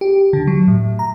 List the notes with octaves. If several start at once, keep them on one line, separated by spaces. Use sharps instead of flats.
G4
D3
F#3
A2
A#5